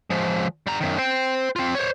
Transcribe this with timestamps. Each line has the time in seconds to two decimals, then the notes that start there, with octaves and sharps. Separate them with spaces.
0.10 F3 G#3
0.67 G3 A#5
0.81 F#2 D#3
0.98 C5 G5
1.56 C4 F4
1.75 C5 C#5